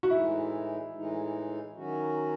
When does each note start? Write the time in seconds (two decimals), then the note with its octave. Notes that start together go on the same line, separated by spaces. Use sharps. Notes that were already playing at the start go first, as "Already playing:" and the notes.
0.03 F#4
0.11 A2 E3 G#3 D#4 E4
0.93 A2 E3 G#3 D#4
1.76 D#3 F#3 C#4 F#4